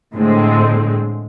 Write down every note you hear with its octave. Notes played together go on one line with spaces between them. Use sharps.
A2 D3 G#3 C4